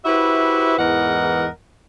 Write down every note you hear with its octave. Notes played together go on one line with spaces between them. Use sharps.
E4 F#4 G4 B4 C5 E5
E2 G#2 E3 A#4 D#5 F#5